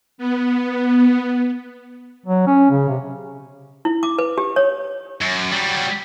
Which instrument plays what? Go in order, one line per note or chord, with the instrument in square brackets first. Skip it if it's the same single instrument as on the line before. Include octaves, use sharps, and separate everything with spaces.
[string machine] B3
[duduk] F#3
C#4
C#3
C3
[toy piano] E4
D6
B4
G4
C#5
[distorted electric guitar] F#2
F#3 G3